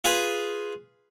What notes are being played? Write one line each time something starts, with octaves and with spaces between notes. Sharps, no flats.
F4 G#4 B4